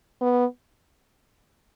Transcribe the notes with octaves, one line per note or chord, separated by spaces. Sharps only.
B3